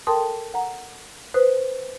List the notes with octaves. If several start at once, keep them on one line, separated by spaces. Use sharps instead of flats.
A4 A#4 G5 A5 C6 D#6
F#5 A#5
B4 C5 D#6 F#6